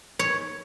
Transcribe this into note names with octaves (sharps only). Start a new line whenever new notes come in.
C#5